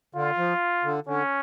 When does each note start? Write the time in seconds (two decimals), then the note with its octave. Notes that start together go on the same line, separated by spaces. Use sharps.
0.15 D3 F4
0.37 F3
0.84 D3
1.07 D3 C#4